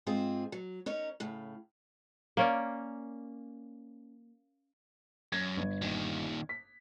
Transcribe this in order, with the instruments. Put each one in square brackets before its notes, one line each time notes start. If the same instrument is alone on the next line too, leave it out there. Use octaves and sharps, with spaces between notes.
[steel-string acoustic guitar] G#2 C4 F4 G#4
F#3
C#4 D#4 A#4 C#5
A2 C#3
[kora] A#3 C#4 D5
[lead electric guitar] F#2 [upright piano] G#6
[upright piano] G1
[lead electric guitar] A#2 D#3
[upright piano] B6